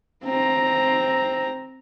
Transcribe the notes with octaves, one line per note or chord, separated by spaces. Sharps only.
C4 A#5